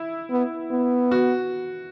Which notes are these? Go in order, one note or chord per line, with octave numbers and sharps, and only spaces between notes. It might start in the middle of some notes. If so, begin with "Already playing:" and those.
Already playing: E4
B3
B3
F#4